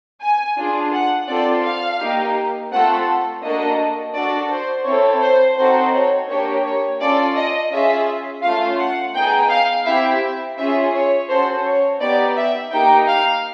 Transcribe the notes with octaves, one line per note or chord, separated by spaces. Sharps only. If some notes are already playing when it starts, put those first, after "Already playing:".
G#5
D4 F4 G#4
F#5
C4 F4 A4 D5
F5
A#3 D#4 G4
A3 C4 F4 A4 F#5
A#3 D4 F#4 A4 D#5
D4 F#4 A4 D5
C5
C4 E4 A4 C#5
C5
C4 D#4 F#4 A4 C5
C#5
A#3 D4 G4 C#5
C#5
C#4 F4 A4 D5
D#5
C#4 F4 G#4 E5
A3 C#4 F4 F5
F#5
B3 D#4 G#4 G5
F5
C4 E4 G4 E5
C#4 F4 G#4 E5
C#5
C#4 F#4 A4 C5
C#5
B3 D#4 G4 D5
E5
A#3 D#4 G4 G5
F5